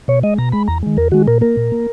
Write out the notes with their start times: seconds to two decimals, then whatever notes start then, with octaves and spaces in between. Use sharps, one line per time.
0.08 B2 C#5
0.23 G#3 D#5
0.38 B2 A#5
0.52 G#3 B5
0.68 E2 A#5
0.83 D#3 G#3
0.97 E2 A#4
1.12 D#3 G#3 F#4
1.27 A#2 A#4
1.41 A#3 A#4
1.57 A#2
1.72 A#3